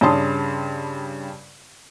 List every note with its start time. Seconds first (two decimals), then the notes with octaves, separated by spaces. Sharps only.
0.01 G2 C#3 G3 A5 C6 D#6